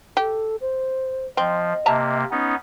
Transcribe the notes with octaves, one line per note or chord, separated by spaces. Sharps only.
G4 A4
C5
F3 C4 D#5
C3 A#3 E5 A5 A#5
B3 C#4 D#4